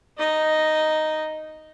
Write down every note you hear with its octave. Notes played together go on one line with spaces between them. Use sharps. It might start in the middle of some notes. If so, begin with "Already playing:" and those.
D#4 D#5